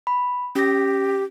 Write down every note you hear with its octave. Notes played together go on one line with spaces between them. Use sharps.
B5
C#4 G4 A#6